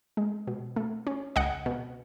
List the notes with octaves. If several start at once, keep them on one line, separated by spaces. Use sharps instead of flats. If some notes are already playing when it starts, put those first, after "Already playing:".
G#3
B2
A3
C#4
C#2 D#5 F#5
B2